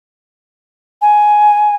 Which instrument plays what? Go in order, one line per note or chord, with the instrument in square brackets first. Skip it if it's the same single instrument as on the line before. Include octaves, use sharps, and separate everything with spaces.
[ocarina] G#5